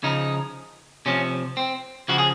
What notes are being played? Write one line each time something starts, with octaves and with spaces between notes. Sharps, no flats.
C#3 F3 D#4
C3 F3 C#4
C4
C#3 F3 F#4
G#4